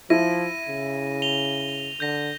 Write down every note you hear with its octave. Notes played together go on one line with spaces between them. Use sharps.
F3 E4 A#6 D#7
C#3
F7 G7
D3 G6 A#6